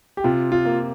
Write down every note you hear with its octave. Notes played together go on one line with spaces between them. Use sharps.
G4
C3 F4
F4
A#3